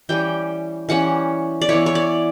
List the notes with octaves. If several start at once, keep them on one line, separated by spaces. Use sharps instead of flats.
E3 G3 C#4 G5
E3 G3 C#4 F#5
D5
E3 B3 E4 C#5
C#5
D5